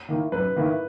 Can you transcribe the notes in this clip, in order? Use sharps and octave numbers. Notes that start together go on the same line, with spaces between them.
D#3 A#3 E4
F#2 B4
D#3 A#3 E4